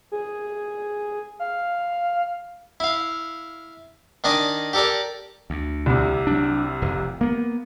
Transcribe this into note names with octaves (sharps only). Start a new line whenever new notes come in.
G#4
F5
E4 F5
D#3 D4 D#5 G#5 D6
G4 A4 A#4 D5
D2
C2 C3
F#3 D4
F1
A#3 B3